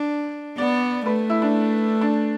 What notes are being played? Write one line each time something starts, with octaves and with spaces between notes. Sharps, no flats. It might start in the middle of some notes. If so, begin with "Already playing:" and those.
Already playing: D4
B3 D5
A3 B4
E4
D4
D4